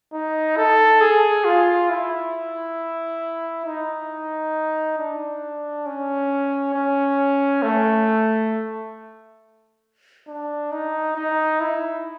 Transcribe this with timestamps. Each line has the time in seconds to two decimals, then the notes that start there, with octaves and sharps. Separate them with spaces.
0.13 D#4
0.57 A4
1.01 G#4
1.45 F4
1.90 E4
3.66 D#4
4.99 D4
5.86 C#4
6.75 C#4
7.62 A3
10.28 D4
10.72 D#4
11.16 D#4
11.60 E4